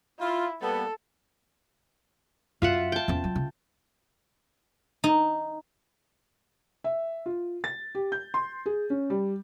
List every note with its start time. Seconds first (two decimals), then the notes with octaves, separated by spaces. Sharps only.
0.19 E4 F4
0.61 G3 A#3 B3 A4
2.62 F#2 F4 E5 F#5
2.92 G5 A5
3.08 E2 C#4
3.24 F#3
3.35 C#3
5.04 D#4
6.84 E5
7.26 F4
7.64 A6
7.95 G4
8.12 G6
8.34 C6
8.66 G#4
8.90 C#4
9.10 G3